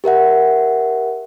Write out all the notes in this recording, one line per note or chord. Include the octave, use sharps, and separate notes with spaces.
G4 A#4 E5 F#5